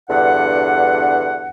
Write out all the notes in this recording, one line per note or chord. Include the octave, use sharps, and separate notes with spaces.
E2 G2 D3 F#5